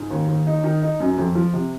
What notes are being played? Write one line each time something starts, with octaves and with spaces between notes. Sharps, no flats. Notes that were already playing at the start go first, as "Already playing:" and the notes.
Already playing: G#2
D#2
D#2
D#4
D#3
D#4
F#2
F2
F3
C3